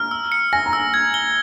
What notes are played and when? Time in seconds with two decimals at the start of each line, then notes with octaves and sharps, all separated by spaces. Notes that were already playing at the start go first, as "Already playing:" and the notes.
Already playing: A#5 F6
0.11 E6
0.32 C#7
0.53 G#5 A#6
0.66 A#5
0.73 E6
0.94 G#6
1.14 G7